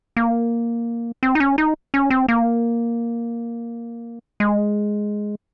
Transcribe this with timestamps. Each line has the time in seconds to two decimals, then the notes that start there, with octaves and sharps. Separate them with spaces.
0.17 A#3
1.23 C4
1.35 D#4
1.40 C#4
1.58 D#4
1.94 C#4
2.10 C4
2.28 A#3
4.40 G#3